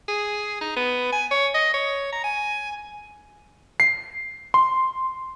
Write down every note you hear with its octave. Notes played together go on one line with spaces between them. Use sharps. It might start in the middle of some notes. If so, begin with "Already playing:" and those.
G#4
D#4
B3
G#5
C#5
D#5
C#5
A#5
G#5
C7
C6